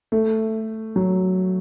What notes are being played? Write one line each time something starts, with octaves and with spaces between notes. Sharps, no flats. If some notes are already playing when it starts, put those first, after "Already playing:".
A3
F#3